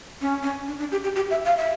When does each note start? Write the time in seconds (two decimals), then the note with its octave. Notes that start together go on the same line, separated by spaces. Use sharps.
0.21 C#4
0.43 C#4
0.68 D4
0.79 D4
0.92 G4
1.04 G4
1.15 G4
1.30 E5
1.45 F5
1.57 E5